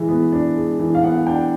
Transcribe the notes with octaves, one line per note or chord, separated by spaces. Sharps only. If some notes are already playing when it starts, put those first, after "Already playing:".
Already playing: E3 G#3
B3
D4
G#3
E3
F5
B3 F#5
D4 G5